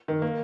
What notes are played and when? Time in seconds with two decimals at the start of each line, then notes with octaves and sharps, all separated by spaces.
0.08 D#3
0.22 A#3